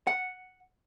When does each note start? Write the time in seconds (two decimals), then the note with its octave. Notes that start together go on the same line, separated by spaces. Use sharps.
0.07 F#5